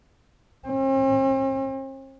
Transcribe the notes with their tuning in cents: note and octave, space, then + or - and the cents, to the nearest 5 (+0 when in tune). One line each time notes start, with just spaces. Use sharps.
C4 +45